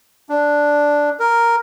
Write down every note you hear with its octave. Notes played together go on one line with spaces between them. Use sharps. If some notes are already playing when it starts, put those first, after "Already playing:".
D4
A#4